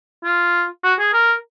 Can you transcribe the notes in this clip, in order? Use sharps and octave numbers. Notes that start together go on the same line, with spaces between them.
F4
F#4
G#4
A#4